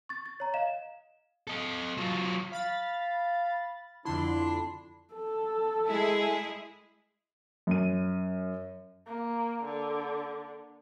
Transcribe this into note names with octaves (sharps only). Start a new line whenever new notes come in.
C#6 A6
A6
C#5 A#5
D#5 F5 E7
A4 D#5
F#3 F4
F5 B5 A6
F2 D3 D4 E4 C6
A4
G#3 E4 G#4
F#2 D#7
A#3
D3